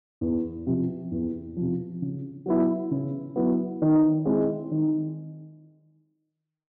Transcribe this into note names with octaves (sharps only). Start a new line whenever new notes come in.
E2
C3 F3
E2
C3 F3
C#3
F#3 B3 E4
C#3
F#3 B3 E4
D#3
G#3 C4 E4
D#3